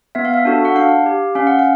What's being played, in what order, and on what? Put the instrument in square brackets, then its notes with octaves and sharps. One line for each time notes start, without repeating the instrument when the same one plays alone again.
[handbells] B3 E5
F5
E5
D4 F#4 A4
F#5
D4 F5
G4
C#4 F5
F#5
F5